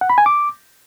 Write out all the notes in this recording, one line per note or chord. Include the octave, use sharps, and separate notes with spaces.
F#5
B5
G#5
D6